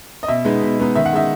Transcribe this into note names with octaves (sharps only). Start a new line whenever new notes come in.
D#5
B2 E5
G#3 B3 D#4
B2
G#3 B3 D#4
D#3 E5
F#5
G#3 D#4 E5